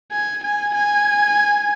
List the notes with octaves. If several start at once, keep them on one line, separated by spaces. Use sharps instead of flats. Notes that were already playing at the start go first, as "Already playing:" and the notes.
G#5
G#5
G#5